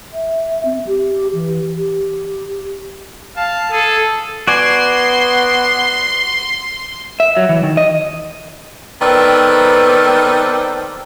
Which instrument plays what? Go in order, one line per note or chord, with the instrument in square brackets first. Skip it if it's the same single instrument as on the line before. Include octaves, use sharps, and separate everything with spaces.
[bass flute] E5
C4
G4
E3
G4
[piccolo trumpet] F5 [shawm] A5
[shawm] G#4 [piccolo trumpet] A4
[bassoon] B3 [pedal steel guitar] F#4 D5 G#5 [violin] C6
[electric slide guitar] E5
F#3
E3
D#3
D#5
[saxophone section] D#3 B3 C4 A4 B4 D5